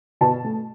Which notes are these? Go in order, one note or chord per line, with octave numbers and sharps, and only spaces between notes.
B2 A5
A3